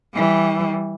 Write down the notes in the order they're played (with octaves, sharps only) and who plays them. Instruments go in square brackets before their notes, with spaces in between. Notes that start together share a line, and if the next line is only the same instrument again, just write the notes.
[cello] E3 G3